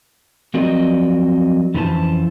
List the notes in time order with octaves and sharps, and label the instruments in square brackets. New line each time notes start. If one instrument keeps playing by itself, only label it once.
[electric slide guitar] F3 F#3 C4 A#4 D5 D#5
F2 E3 C#4 D4 C5 A5